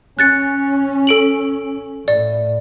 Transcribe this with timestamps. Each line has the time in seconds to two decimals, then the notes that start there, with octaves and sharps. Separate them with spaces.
0.19 C#4 F#6 A6 C#7
1.07 A4 D7 F#7
2.08 A2 D5